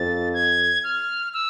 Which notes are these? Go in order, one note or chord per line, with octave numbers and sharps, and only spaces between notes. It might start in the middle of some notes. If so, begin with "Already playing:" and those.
Already playing: F2 A6
G#6
F6
E6